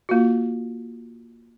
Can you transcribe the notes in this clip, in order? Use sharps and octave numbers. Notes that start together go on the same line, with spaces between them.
A#3 F4 F#4